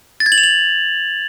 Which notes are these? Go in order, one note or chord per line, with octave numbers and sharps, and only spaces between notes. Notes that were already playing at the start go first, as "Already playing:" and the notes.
A6
G#6
F#7
F7
F#7